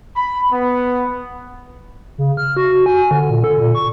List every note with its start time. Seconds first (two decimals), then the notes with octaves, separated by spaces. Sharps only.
0.15 B5
0.50 B3
2.18 C#3
2.37 F6
2.57 F#4
2.86 G#5
3.11 D3
3.30 A#2
3.44 A4
3.60 A#2
3.75 C#6